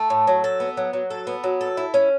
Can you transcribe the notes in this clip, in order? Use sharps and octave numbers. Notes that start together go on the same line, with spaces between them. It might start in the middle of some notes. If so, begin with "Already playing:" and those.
Already playing: A3
A2
F#3
A4
B3
F#3
F#3
A4
B3
F#3
A4
E4
C#4